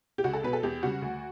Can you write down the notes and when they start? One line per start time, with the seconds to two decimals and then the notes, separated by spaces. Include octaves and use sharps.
0.18 G4
0.24 C#2 F#4
0.33 A4
0.43 B2 F#3 B4
0.53 A4
0.63 E2 G4
0.83 C#3 G3 F#4
1.02 D2